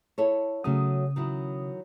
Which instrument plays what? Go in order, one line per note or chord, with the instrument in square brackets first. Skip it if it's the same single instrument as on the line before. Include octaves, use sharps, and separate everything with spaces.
[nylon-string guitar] E4 A4 C#5
[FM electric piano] C#3 D#6 [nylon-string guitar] F#3 A3 C#4
[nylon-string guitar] D#3 F#3 E4